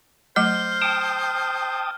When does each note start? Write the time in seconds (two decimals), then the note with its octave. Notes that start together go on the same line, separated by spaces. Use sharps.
0.36 F#3 A3 C5 D#5 F6
0.82 G5 A5 D#6